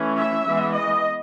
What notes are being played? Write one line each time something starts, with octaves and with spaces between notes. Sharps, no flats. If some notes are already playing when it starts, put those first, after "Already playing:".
Already playing: E3 A3 C#4
E5
E3 G#3 B3
D#5